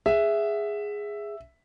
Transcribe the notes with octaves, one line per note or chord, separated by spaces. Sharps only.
G#4 E5 F#5